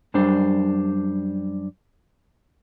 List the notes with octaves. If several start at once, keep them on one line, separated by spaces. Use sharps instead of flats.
F#2 G3 D4 C5